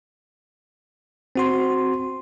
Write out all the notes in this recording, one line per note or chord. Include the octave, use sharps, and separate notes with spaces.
C4 F#4 C6